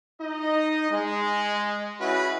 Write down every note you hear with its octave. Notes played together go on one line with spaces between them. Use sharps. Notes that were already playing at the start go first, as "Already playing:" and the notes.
D#4 D#5
G#3
C#4 E4 F#4 G#4 B4 D#5